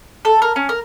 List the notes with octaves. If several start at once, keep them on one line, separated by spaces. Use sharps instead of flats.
A4
A#4
C#4
A#4